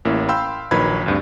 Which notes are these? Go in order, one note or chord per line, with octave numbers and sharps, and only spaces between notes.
A1 A#3 C#4 E4
F5 G5 B5 C6 E6 G6
A#1 D#3 F#3 B4 B5 G#6
D2 G2 C4